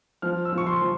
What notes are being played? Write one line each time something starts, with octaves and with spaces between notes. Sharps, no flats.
F3 F6
E6
F3
C#6
C6
F3